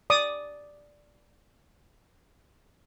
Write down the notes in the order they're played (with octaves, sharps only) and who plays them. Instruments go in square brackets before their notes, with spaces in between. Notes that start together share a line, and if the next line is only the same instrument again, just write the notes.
[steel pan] D5 D6 D#6